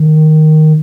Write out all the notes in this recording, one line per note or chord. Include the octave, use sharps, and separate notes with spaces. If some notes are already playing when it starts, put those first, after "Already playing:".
Already playing: D#3